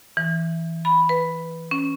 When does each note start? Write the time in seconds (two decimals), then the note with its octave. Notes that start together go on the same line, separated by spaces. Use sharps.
0.17 E3
0.85 B5
1.09 B4
1.71 C#4